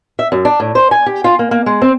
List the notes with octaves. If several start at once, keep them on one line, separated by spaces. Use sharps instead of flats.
E5
F#2
D4
A2
C5
G#5
G4
F4
A#3
A#3
G#3
C4